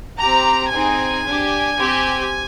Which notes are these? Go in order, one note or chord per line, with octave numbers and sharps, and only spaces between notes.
C4 G4 A#5
C4 D#4 G#4 G#5
D4 G4
C4 G4